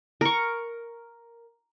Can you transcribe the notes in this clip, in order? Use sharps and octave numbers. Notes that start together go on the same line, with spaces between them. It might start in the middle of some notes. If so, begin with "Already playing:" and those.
A#4 C#6